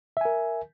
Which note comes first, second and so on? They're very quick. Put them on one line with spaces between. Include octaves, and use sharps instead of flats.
E5 G#5 A#4